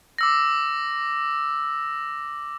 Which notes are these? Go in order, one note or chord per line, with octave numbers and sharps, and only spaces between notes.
D6 E6 A#6